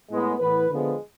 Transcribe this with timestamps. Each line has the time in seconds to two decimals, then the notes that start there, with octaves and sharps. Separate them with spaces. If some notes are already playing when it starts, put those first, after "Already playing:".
0.09 A2 G#3 B3
0.39 A2 E3 B3 B4
0.70 D3 F3 G#3 B3